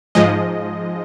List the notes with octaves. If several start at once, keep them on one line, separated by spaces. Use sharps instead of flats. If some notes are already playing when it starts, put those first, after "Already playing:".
G#2 F3 G#3 D#5